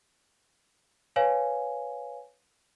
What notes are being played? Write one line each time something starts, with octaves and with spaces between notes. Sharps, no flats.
B4 C#5 F5 G#5